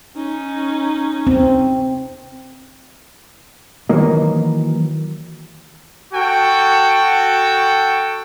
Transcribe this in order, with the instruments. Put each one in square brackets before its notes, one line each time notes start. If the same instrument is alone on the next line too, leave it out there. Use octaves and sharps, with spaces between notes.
[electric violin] C#4 D#4
[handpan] C4
[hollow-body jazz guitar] D#3 E3 F#3 A#3 D#5
[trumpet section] F#4 A4 G5